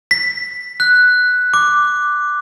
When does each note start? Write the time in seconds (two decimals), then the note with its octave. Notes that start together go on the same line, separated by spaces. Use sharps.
0.11 B6
0.80 F#6
1.54 D6